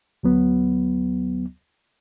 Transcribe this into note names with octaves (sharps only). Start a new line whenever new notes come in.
D2 F#3 B3